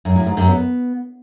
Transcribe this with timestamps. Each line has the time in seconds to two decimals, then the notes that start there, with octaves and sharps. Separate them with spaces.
0.05 F#2
0.16 A2
0.26 G#2
0.37 F#2
0.48 B3